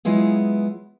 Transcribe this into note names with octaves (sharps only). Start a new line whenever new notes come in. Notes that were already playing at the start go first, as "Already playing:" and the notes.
F#3 G#3 B3 E4 F4 G#4